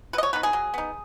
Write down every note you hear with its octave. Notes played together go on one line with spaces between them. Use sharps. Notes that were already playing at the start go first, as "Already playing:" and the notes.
F#3 B4
D#5
C#5
B3 D#4 B4
G#4
F#3
B3 D#4